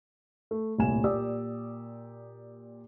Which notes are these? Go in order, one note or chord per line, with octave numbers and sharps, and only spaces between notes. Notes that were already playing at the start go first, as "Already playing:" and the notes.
A3
D#1 C2 A2 G#5 E7
A#2 G4 D5 D#6 E6